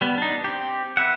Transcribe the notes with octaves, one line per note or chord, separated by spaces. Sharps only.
G3 B3
D4 D#4
C4 G4
B4 E5 F#5